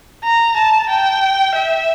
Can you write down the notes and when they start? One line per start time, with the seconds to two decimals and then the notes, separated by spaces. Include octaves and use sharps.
0.24 A#5
0.57 A5
0.89 G5
1.55 E5